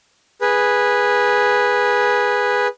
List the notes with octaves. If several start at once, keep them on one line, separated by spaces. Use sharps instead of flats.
G#4 B4